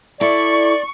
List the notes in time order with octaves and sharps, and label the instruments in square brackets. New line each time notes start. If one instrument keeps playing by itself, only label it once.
[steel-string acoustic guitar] E4 A4 [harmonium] D5 [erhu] C#6